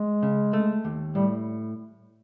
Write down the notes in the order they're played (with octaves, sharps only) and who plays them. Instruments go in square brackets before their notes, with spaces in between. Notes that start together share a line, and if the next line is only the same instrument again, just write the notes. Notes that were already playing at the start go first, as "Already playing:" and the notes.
Already playing: [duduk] G#3
[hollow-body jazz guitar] C#3
A3
D#2
[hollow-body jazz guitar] A2 [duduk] G3